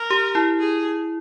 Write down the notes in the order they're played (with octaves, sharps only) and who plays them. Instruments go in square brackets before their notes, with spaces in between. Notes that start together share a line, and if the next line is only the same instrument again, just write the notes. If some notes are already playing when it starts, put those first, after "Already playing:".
Already playing: [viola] A#4
[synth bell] G4
E4
[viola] G#4